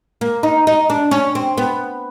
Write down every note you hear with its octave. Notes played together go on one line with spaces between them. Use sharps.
A#3
D#4
D#4
D4
C#4
C4
B3